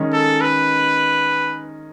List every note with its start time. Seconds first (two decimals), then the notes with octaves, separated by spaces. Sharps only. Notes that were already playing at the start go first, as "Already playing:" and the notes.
Already playing: D#3 G#3 C#4
0.13 A4
0.41 B4